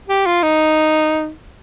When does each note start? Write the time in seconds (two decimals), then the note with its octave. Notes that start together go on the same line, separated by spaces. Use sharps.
0.09 G4
0.26 F4
0.43 D#4